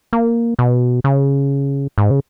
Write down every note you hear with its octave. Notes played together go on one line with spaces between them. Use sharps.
A#3
B2
C#3
G#2
C#3